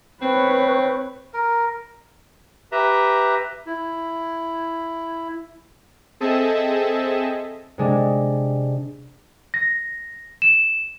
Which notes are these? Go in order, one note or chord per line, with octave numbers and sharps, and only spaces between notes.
C4 B4 C#5
A#4
G4 B4 E5 A#5
E4
C4 G#4 A4 D#5 E5 A5
C3 G#3 D4
A#6
E7